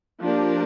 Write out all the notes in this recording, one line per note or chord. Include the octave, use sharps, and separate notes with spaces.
F3 A#3 D4 G4 A#4